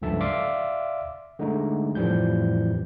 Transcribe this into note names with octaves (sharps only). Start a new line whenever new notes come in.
C#2 G2 F3 A4 E5 A5
D5 E5 F5 C6 D6
D3 G#3 A3 D#4
F2 A2 E3 F3 G3 G6